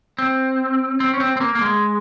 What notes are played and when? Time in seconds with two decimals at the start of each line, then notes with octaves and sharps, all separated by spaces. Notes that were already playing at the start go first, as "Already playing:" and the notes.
0.19 C4
1.00 C4
1.14 C#4
1.20 C4
1.37 C4
1.40 A#3
1.55 A#3
1.61 G#3